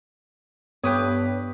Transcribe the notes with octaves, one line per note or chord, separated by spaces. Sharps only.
G2 B3 G4 B4 C#5 D#6